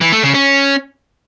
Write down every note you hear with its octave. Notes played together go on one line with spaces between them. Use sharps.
E3
A3
C#3
C#4